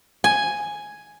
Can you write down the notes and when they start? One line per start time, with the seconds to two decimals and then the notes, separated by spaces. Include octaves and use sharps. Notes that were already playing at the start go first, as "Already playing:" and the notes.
0.24 G#5